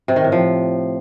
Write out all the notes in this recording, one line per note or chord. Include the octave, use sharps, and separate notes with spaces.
C3
D#3
A2
F3